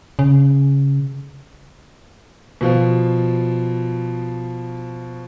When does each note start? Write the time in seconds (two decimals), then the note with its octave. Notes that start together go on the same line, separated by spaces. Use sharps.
0.19 C#3
2.61 B2 F3